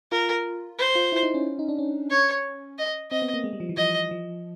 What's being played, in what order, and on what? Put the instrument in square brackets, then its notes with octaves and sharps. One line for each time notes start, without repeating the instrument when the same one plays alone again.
[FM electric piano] F4 [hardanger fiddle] A#4
[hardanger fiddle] C5
[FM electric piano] F4
E4
D#4
C#4
D#4
D4
C#4
[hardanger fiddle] C#5
D#5
[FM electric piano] C4 [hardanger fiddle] D#5
[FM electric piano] B3
A#3
G#3
G3
F3
E3
[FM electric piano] F3 [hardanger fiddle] D#5
[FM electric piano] F3